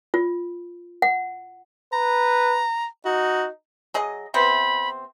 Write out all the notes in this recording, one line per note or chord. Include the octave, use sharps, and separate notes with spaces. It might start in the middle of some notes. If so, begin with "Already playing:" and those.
F4
F#5
B4 A#5
D#4 F#4
F#3 G#4 D#5
C3 B3 C4 B5